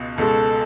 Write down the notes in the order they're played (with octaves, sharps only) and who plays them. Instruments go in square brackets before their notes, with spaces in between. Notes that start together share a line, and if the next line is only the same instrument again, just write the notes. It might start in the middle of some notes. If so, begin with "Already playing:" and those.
Already playing: [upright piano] C#2 B2
[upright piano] C#2 B2 G#3 [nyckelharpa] A4